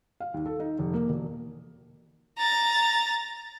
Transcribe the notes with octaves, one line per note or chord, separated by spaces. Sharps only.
F5
D#2
A4
D#4
F1
A#3
E1
A#5 A6